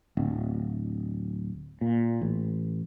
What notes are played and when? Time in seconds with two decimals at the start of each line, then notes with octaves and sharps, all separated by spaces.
0.17 D1
1.81 A#2
2.21 A1